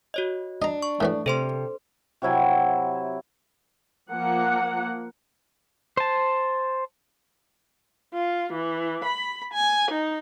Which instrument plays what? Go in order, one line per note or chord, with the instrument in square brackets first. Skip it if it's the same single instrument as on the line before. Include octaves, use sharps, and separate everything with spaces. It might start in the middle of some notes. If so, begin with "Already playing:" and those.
[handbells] F#4 C#5 D#5
[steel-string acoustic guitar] D4 [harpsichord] D#5 A#5
[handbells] C#6
[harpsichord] A2 E3 F#4 [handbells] A3
[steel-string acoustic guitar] C3 [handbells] A4 C5 C6
[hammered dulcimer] C3 F#3 E4 G#5
[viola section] F3 A#3 F#5
[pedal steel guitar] C5 A5
[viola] F4
E3
B5
G#5
D#4